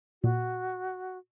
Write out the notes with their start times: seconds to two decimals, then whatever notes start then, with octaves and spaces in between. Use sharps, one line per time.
0.23 A#2 F#4